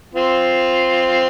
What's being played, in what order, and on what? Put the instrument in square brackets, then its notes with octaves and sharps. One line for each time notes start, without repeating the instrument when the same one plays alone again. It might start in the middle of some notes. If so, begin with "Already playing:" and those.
[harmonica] C4 F4